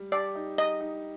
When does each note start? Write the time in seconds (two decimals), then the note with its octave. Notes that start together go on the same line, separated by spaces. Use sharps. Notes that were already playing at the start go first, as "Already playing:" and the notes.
Already playing: G3
0.12 G4 D5
0.35 D#4
0.58 G4 D#5
0.81 D#4